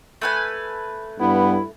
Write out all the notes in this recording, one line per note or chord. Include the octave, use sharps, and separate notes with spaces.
A3 B4 G#5
G2 B3 E4